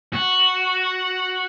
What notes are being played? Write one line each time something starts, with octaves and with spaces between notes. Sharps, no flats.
F#4